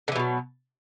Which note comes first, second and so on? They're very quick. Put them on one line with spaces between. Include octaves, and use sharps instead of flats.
D3 E3 B2 F#3